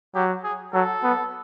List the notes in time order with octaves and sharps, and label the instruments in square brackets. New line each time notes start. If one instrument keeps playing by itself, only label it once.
[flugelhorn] F#3 [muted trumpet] G4
[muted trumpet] G#4
[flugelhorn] F#3 [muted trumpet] A4
[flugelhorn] B3